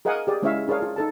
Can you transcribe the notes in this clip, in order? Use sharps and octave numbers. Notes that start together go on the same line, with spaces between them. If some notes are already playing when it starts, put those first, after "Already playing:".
G#4 A#4 D#5 F5 F#5 G#5
G4 G#4 D5
G#3 C#4 E4 C#5 E5 F5
D4 G#4 A#4 C#5 F5
F4 G#4
D#4 A4 A5